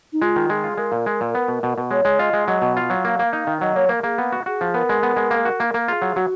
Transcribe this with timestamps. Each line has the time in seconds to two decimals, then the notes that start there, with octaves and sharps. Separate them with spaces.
0.13 D#4
0.21 G#3 F4
0.36 D#3
0.50 G#3 G#4
0.64 F4
0.78 G#3 A#4
0.92 A#2
1.06 G#3
1.21 A#2
1.35 B3
1.48 B2
1.63 B2
1.78 B2
1.91 G#3 C#5
2.05 G#3
2.19 F4 D#5
2.33 G#3
2.48 F#3 D#5
2.62 B2
2.76 F4 F5
2.90 F#3
3.05 A#3
3.19 A#3
3.33 D#4
3.47 D#3
3.61 F#3 D#5
3.76 A#3 C#5
3.89 A#3 A#4
4.03 A#3 G#4
4.18 B3
4.32 F#4
4.46 F#4 G#4
4.61 F3
4.74 B3 A#4
4.89 G#3
5.03 B3
5.16 G#3
5.31 A#3
5.45 F#4
5.60 A#3
5.74 A#3
5.88 F4 G#4
6.02 F#3
6.16 F#3 F#4